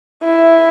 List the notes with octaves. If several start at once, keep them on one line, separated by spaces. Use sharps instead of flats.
E4